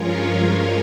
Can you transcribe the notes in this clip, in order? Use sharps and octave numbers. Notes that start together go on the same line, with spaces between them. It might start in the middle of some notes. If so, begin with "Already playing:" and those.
Already playing: G2 F3 G#3 C#4 F4 A#4 C#5
A#4 C#5